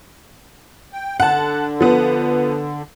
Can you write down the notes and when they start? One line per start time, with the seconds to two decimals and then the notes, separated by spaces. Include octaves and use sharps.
0.93 G5
1.20 D3 F#5 A5
1.81 F3 B3